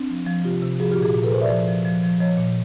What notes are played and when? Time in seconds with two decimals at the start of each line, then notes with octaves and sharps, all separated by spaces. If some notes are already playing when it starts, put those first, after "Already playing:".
Already playing: C4 D4
0.10 F3
0.27 F3
0.44 C3 F4 G4
0.62 C3
0.79 F3 F#4 G#4
0.91 F4 G4
0.97 A#2
1.02 F#4 G#4
1.14 A#2
1.24 A4 B4
1.32 A#2 A#4 C5
1.41 D5 E5
1.49 F3
1.68 F3
1.85 F3
2.03 F3
2.20 F3 C#5 D#5
2.38 A#2